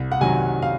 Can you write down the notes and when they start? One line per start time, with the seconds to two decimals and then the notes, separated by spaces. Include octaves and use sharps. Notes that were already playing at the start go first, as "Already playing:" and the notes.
Already playing: C2
0.12 F#5
0.20 C3 D#3 F#3 G#5
0.62 F5